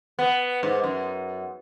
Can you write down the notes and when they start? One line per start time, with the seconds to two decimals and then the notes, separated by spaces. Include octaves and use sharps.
0.19 B3
0.63 G#2
0.84 F#2